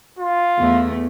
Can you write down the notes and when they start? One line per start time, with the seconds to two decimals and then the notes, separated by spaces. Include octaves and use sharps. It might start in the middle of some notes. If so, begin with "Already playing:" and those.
0.19 F4
0.59 E2 A3